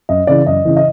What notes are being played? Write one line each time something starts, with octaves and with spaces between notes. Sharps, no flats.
F#2 D#5
C#3 E3 D5
F#2 D#5
C#3 E3
D#5